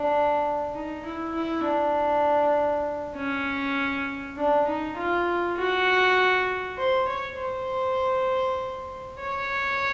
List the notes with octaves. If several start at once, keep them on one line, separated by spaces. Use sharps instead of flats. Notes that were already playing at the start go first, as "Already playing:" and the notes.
Already playing: D4
D#4
E4
E4
D4
C#4
D4
D#4
F4
F#4
C5
C#5
C5
C#5